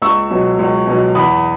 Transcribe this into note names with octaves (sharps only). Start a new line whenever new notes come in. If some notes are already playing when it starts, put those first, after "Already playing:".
C#2 C#6 E6
B2 F#3
C#2
B2 F#3
E2 B5 D#6